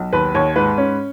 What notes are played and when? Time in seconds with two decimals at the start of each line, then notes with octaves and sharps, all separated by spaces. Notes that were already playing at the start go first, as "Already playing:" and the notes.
Already playing: B1
0.13 D#2 B4
0.34 D#2 C#5
0.56 G#2 B4
0.77 C#4